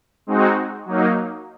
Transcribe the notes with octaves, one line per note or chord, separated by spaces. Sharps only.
G#3 C4 D#4 F#4
F#3 A#3 D#4